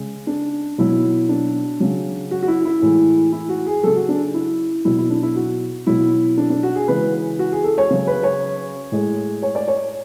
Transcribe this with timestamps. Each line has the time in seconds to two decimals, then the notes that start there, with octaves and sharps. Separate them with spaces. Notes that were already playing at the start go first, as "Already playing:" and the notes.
Already playing: C#3 G#3
0.27 D4
0.78 B2 F#3 E4
1.29 D4
1.80 C#3 F#3
2.31 F#4
2.43 F#4
2.48 E4
2.65 E4
2.81 A2 E3 G#3
3.32 E4
3.49 F#4
3.66 G#4
3.83 C#3 F#3 A4
3.96 F#4
4.09 D4
4.34 E4
4.85 B2 F#3 E4
4.98 E4
5.10 D4
5.23 E4
5.36 F#4
5.87 B2 F#3 E4
6.38 D4
6.50 D4
6.63 F#4
6.75 G#4
6.88 C#3 E3 G#3 B4
7.39 F#4
7.52 G#4
7.64 A4
7.78 C#5
7.90 C#3 F#3
8.07 B4
8.23 C#5
8.92 A2 G#3
9.43 C#5
9.55 D5
9.68 C#5